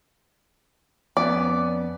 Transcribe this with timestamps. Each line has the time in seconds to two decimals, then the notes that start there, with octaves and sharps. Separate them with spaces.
1.17 F2 B3 C#4 D5